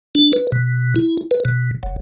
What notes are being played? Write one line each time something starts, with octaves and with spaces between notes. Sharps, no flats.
D4
B4
B2
E4
B4
B2
F#1